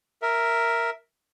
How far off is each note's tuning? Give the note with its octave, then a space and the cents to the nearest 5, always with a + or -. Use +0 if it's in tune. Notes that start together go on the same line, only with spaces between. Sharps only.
A#4 +0 E5 +0